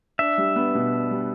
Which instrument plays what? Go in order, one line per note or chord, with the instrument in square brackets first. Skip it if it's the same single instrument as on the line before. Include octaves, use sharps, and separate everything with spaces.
[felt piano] D4 [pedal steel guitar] E5
[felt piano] G3
B3
B2
D4
G3